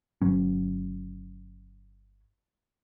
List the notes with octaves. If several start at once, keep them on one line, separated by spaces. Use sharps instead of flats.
G1 F#3 C#4